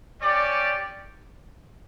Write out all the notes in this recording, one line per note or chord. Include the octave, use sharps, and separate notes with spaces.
C#4 G4 D5